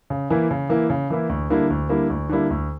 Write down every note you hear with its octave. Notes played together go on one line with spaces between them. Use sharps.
C#3
E3 A#3 E4
C#3
E3 A#3 E4
C#3
E3 A#3 E4
D2
D3 G3 A#3 E4
D2
D3 G3 A#3 E4
D2
D3 G3 A#3 E4
D2